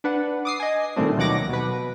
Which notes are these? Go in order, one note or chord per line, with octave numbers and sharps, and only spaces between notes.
D4 B4 F#5
D6 D#6 C7
D#5 G#5
A#2 D#3 G3 A3 C4 D4
D#2 B2 F#3 F#5 D6 A#6
B2 B4